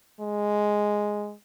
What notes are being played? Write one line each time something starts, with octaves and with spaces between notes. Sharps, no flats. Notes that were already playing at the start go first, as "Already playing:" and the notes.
G#3